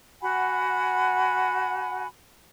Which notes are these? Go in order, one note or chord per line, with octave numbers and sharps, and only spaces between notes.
F#4 F#5 G#5 B5